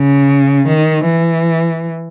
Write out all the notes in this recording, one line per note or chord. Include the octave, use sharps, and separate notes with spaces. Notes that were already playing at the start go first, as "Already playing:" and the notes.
Already playing: C#3
D#3
E3